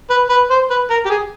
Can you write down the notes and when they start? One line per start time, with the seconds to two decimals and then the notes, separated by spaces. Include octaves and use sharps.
0.10 B4
0.29 B4
0.50 C5
0.70 B4
0.90 A#4
1.05 G4
1.10 G#4